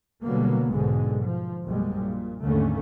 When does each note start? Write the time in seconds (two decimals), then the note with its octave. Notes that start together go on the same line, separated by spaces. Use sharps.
0.23 B2 D3 F#3 G3 A#3 B3
0.69 B1 G#2 B2 D3 G#3
1.21 F3
1.67 A#1 F#2 B2 G3 G#3
1.97 A#2
2.43 D#2 G#2 D3 A3 A#3 C#4